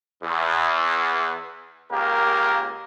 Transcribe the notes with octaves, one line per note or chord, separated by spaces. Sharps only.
E2
C#2 A#3 G4 A#4